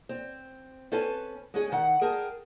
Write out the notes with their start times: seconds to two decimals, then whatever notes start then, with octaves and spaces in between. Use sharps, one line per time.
0.09 C4
0.92 C4 C#4 A4 B4 G#5 A5
1.54 G#3 C#4 G#4
1.72 D#3 F#5
2.01 G#4 A#4 G5 A5